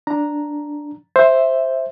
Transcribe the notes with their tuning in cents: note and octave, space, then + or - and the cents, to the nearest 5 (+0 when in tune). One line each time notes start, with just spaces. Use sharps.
D4 +0 A#5 +0
C5 +5 E5 +0